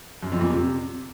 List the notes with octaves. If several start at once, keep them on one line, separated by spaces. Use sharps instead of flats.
F#2
F2
A#2
C3